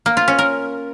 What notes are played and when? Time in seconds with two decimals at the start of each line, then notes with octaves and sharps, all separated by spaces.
0.06 A#3
0.17 F4
0.28 C#4
0.39 A#4